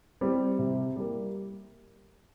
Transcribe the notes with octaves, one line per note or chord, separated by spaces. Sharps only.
G3 C4
C3
G3 A#3